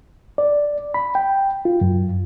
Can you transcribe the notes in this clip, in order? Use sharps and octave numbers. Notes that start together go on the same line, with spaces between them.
D5
B5
G5
F4
F#2